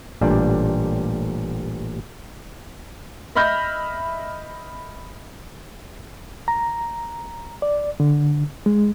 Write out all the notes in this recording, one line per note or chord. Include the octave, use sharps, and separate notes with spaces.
A1 A#2 G3 D4
D#5 E5 B5 F6 G6 A#6
A#5
D5
D3
G#3